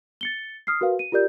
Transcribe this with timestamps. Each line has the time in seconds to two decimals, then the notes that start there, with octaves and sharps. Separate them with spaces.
0.21 A6 C#7 G7
0.67 D#6 F6 C7
0.81 F#4 A#4 B4 F5
0.99 D#7
1.12 F4 G4 A#4 D5 G6